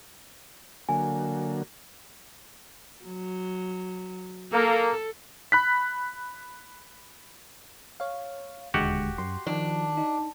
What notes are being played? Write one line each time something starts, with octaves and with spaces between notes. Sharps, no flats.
D3 F#3 A#3 G#5
F#3
A#3 A4
B5 F#6 B6
C#5 F5
E1 D#2 D3 G#3 F#4 G4 F#5
F#2 C6
D#3 F3 D4
D#4